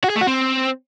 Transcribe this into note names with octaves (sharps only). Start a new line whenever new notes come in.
F#4
G#4
A3
F#4
C4